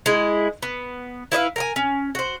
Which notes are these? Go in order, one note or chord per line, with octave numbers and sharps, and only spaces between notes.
G#3 E4
B3
E4 B4 D#5 F5
A#4 G5 G#5
C#4
F#4 C5